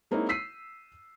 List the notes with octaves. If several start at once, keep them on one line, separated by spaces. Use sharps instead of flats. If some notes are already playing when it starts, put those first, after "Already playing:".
G#3 A#3 C4 D#4 E4 C#5
E6 B6 C7 D#7